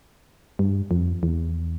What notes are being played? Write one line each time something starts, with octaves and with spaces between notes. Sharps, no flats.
G2
F2
E2